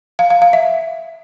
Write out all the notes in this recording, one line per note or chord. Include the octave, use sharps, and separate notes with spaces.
F5
F5
F5
E5